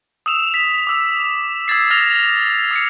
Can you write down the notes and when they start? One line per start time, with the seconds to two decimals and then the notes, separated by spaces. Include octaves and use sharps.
0.26 D#6 E6 E7 F7
0.54 B6
0.87 D6 E6 F7
1.68 E6 G#6 A6 C7
1.90 D#6 F6 A6 A#6 E7 F7
2.71 D#6 C7 C#7